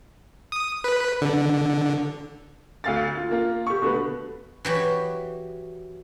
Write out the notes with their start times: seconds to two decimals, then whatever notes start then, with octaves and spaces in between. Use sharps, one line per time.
0.52 D#6
0.84 B4
1.21 D3
2.84 D2 F5 A6
3.17 F4
3.31 A#3 F4
3.67 G4 C#6
3.82 B2 D3 A3 B4
4.65 E3 F#3 G4